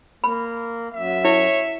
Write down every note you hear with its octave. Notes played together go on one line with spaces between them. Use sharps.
A#3 B5
F#2 E5
E4 C#5